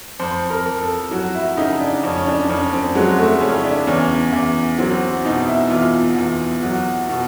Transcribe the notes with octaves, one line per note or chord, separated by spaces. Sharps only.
F2 C5
A#4
F2
A4
F#3 F#4
E4
C#3 D#4
D4
F2 C#4
C#4
D4
F2 C#4
C4
F#3 G#3
A3
C#3 C#4
D4
E2 C#4
E2
F#3 C4
B2 D#4
E4
E2 F4
E2
F#3 F#4
B2